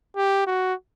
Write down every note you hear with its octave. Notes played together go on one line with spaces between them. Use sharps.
G4
F#4